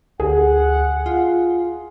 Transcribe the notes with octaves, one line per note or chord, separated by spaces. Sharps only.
D2 G#4 F#5
F4